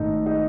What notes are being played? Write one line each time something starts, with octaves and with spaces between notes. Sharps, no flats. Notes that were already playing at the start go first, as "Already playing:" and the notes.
Already playing: G#1 G#2 D#3 A3 D#4
D#4